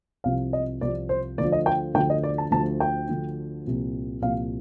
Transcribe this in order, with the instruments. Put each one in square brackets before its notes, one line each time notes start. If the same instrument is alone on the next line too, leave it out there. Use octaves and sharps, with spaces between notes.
[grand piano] C2 C3 F3 F5
D#5
C2 C3 F3 D5
C5
D2 D3 F3 D5
D#5
G5
D2 D3 F3 G5
D#5
D5
A5
D2 D3 F3 A5
G5
D2 D3 F3
C2 A#2 F3
C2 A#2 F3 F5